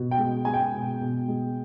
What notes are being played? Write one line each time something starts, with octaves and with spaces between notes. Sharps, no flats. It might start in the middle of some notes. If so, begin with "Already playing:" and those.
Already playing: B2
G5
G#3
G#3 G#5
G5
B2
B2
G#3